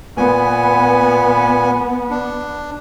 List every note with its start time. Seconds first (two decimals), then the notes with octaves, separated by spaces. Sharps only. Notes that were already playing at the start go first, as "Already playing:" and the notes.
0.17 A#2 B3 G#5
2.10 D4